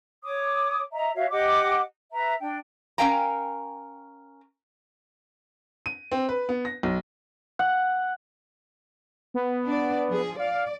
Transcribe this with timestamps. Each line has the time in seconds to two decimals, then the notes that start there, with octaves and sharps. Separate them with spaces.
0.23 C#5 D6 D#6
0.93 D#5 E5 A#5
1.15 F#4 C#5 E5 F5
1.31 G4 D#5 F#5 D6
2.12 B4 E5 A#5
2.39 D4 G5
2.98 C#4 A#4 F5 G5 G#5 A#5
5.86 D#7
6.12 C4
6.29 B4
6.49 B3
6.65 A#6
6.83 B1
7.59 F#5
9.34 B3
9.66 D4 D5
10.08 F3 G#4
10.39 D5 F5